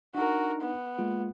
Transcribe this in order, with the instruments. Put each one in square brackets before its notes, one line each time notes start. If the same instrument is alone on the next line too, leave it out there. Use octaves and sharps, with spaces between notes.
[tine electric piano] D4 D#4 [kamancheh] F#4 A#4
[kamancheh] B3
[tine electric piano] G#3 A#3 F4